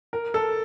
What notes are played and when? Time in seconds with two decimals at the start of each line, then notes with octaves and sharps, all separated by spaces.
0.13 A#4
0.34 A4